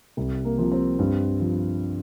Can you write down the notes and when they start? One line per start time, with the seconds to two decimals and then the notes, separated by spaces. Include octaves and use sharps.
0.17 C2
0.45 A#3
0.58 C3 F3
0.72 C4
0.99 G2
1.40 F3